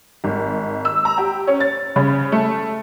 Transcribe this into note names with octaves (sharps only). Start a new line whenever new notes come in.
G#1
E6
A#5
G4
C#4
A6
C#3
A3